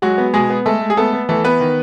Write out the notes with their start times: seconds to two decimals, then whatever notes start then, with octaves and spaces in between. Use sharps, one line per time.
0.02 F#3 G#3 F#4
0.18 B3
0.34 B2 G#3 G#4
0.50 B3
0.66 G#3 A3 A4
0.81 G#3
0.90 G#4
0.97 A3 B3 A4
1.13 B3
1.29 E3 A3 A4
1.44 B3 B4
1.60 D#3